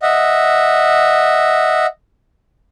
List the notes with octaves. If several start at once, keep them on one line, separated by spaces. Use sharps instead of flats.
D#5 E5 F#5